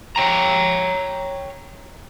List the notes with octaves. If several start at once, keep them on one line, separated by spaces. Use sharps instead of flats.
C#5 G5 A#5